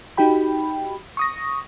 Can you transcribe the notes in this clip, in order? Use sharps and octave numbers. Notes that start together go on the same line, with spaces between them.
D#4 F#4 G4 G5 B5
C#6 D#6 A#6